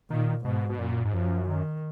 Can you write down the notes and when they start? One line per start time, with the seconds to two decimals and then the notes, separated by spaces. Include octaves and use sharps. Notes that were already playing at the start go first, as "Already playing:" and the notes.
0.10 A#2 D#3
0.44 G#2 B2
0.69 B2
0.79 F#2 A#2
1.05 G#2
1.13 F#2 F3
1.48 D#3